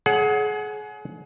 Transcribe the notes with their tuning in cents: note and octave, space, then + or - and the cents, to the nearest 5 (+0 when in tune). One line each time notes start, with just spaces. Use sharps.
G#4 +30 C#5 +0 F#5 +0